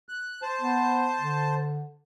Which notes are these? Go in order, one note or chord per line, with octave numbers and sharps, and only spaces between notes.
F#6
C5 A5
B3
D3